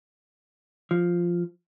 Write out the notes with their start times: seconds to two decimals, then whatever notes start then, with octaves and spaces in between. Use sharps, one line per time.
0.91 F3